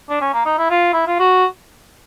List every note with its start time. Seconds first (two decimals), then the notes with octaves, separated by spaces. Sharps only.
0.09 D4
0.21 C#4
0.33 A#3
0.45 D#4
0.58 E4
0.70 F4
0.93 E4
1.07 F4
1.19 F#4